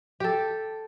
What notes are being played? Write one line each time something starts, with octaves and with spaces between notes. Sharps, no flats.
G4 A4